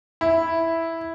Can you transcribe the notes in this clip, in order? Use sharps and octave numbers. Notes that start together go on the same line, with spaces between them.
E4